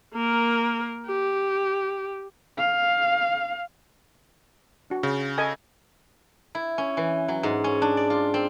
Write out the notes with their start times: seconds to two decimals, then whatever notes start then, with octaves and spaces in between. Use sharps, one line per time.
0.14 A#3 A#4
1.07 G4
2.58 F5
4.90 D4 F#4
5.03 C#3
5.38 A4 D#5 G#5
6.55 E4
6.78 C#4
6.97 E3
7.28 F#3
7.43 G#2
7.64 C#4
7.82 D4
7.97 D5
8.10 F4
8.34 C4